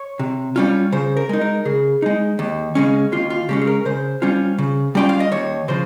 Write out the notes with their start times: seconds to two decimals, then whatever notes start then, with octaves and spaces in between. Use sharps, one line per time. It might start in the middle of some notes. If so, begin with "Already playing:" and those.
Already playing: C#5
0.19 C3
0.56 G3 C#4 F4
0.92 C#3 C5
1.17 A#4
1.29 G#3 D#4
1.41 A#4
1.65 C#3 G#4
2.02 G#3 D#4
2.39 D#2
2.75 C#3 G#3 C#4
3.12 D#2 F4
3.30 F4
3.49 C#3 G#3 C#4 G4
3.61 G#4
3.67 A#4
3.85 C#3 C5
4.22 G3 C#4 F4
4.58 C#3
4.95 G3 C#4 F4 G5
5.09 F5
5.20 D#5
5.32 D#2 C#5
5.68 C#3 F3 C5